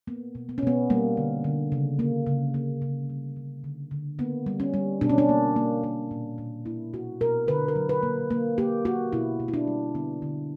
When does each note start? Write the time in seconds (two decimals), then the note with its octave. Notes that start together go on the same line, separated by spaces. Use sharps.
0.07 A#3 B3
0.35 B2
0.49 B3
0.58 C#4
0.62 B2 B3
0.90 G3 A#3
1.17 D3
1.44 D3
1.72 C#3
1.99 A#3
2.27 C#3
2.54 A#3
2.82 C#3
3.10 G3
3.36 D3
3.64 D3
3.91 D3
4.19 A#3 B3
4.46 G3
4.60 C#4
4.74 G3
5.01 B2 D4
5.09 C#4
5.18 D4
5.29 A#3
5.56 A#3
5.83 A#3
6.11 A#2
6.38 A#2
6.66 A#3 E4
6.93 B2 F#4
7.21 B2 A#4
7.48 D3 B4
7.68 A#4
7.76 F#3
7.89 B4
8.03 A#3
8.31 A#3
8.58 A#3 G4
8.85 A#3 F#4
9.13 B2 E4
9.40 B2
9.48 E4
9.54 D4
9.67 G3
9.95 D3 B3
10.22 D3